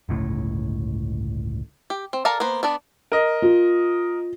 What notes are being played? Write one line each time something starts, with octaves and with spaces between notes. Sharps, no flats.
G1 C#2 A2
G4
C4
A4 A#4 D5 F5 A5
A#3 B3 B4 C5
B3 D4 D5
A#4 D#5
F4